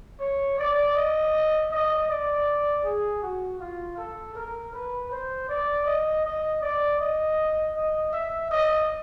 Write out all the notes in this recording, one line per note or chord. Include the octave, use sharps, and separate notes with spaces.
C#5
D5
D#5
D#5
D5
G#4
F#4
F4
A4
A#4
B4
C5
D5
D#5
D#5
D5
D#5
D#5
E5
D#5